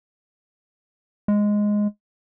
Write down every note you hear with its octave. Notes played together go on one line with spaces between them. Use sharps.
G#3